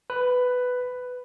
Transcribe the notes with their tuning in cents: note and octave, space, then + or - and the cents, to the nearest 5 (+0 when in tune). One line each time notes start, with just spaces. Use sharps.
B4 +10